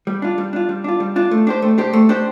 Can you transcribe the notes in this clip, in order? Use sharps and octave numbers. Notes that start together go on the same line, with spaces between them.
G3
D4 F4
G3
D4 F4
G3
D4 F4
G3
D4 F4
A3
D4 G4 C5
A3
D4 G4 C5
A3
D4 G4 C5